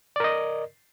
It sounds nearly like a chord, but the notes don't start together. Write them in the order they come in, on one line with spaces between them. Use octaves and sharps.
D5 A#4 D#5